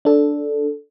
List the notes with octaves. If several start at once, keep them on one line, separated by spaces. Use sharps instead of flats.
D4 A4